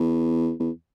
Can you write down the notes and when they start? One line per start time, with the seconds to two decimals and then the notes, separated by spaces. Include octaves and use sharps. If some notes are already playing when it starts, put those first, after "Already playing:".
Already playing: E2
0.60 E2